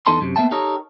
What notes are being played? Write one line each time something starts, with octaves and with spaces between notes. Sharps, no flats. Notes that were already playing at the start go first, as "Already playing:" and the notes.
E2 D#4 A4 D#5 A5 C6
F#2 C3
A#3 B3 E5 G5 A5
D#4 G4 A4 A#4 C#5 D#5